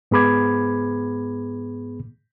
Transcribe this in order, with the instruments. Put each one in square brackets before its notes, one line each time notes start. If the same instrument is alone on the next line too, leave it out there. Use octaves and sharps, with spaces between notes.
[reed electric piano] G#2 B3 G#4 B5 D6 G#6